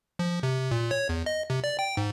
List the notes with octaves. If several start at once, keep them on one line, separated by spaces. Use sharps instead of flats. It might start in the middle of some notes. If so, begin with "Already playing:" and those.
F3
C3
A#2
C#5
E2
D#5
C3
D5
G5
G#2